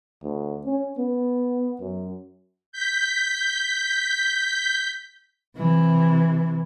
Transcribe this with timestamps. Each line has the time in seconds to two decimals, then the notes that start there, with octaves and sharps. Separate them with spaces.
0.23 D2
0.66 C#4
0.98 B3
1.80 F#2
2.72 G6 B6
5.57 C3 E3